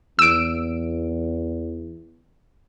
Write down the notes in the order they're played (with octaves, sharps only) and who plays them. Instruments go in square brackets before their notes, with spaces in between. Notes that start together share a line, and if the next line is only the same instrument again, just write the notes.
[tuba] E2 [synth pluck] E6 D7